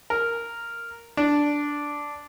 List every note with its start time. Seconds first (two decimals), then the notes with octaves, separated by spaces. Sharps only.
0.10 A#4
1.17 D4